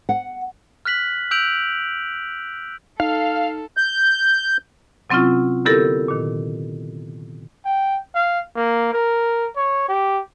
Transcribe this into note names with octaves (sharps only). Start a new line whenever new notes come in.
F#5
F6 F#6 B6 F#7
E6 F#6 G6 D7 F7 F#7
D#4 A4 F5
G6
C3 F#3 C4 C#4 E4 F4
D3 B3 E4 G4 A4 A#4
A#2 D#3
G5
F5
A#3
A#4
C#5
G4